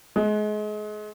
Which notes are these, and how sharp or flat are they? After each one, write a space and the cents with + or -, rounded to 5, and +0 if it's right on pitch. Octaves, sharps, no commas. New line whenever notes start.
G#3 +30